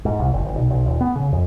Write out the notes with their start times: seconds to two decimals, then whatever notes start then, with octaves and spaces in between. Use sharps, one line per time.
0.05 G#2
0.19 C2
0.33 F#1
0.45 G1
0.57 B1
0.70 B1
0.86 D#1
1.01 B3
1.16 C#3
1.32 F2